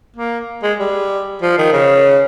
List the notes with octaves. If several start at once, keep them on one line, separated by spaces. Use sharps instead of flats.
A#3
G#3
G3
F3
D#3
C#3